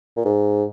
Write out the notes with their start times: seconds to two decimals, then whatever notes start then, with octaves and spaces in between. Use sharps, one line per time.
0.17 A#2
0.25 G#2